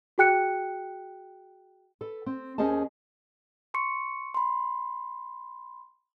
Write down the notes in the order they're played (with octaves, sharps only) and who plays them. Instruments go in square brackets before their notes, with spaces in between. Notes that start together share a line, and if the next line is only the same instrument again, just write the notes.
[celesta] F#4 G#4 G5 F#6 C#7
[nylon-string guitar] A4 B4
C4
D#2 C#4 G#4 C5 D#5 A5
[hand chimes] C6 C#6 C#7
B5 C6